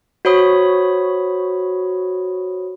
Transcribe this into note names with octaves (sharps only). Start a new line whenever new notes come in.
F#4 C5 C#5 B5 D#6